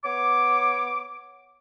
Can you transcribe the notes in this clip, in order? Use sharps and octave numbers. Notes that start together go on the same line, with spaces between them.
B3 C#5 D6